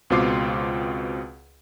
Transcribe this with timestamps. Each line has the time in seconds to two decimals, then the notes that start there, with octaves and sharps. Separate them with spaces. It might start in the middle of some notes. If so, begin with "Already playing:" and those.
0.10 C#2 B2 C4 F4 D6 C7